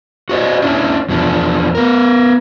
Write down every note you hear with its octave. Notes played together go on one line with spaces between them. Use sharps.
F#4 C5 D5 D#5
C#4 D4 E4
E2 F3 D4
B3 A#4